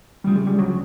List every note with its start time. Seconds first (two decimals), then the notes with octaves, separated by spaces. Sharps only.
0.24 D2 C#3 F3 G3
0.36 G#3
0.47 G3
0.59 F#3